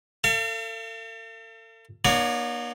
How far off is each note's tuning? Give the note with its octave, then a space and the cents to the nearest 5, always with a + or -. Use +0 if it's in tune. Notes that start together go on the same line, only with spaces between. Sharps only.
A4 +40 F5 -40
A#3 +45 D#4 -35 C#5 +30